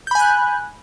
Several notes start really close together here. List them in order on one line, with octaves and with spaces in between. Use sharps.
G6 B5 G#5 F#6